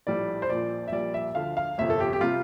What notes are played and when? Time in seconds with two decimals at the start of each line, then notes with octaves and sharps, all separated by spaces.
0.07 A#1 A2 G3 D5
0.42 C5
0.49 A#1 A#2 F3 D5
0.88 E5
0.92 A#1 A#2 G3 D5
1.14 E5
1.35 D2 D3 F3 F5
1.57 F5
1.78 G1 F2 C3 E5
1.90 A4
2.00 G4
2.13 G4
2.21 C3 G3 F4